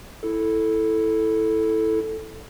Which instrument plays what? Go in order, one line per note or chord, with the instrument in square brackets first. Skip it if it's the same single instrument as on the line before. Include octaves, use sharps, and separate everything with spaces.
[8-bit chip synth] E4 A4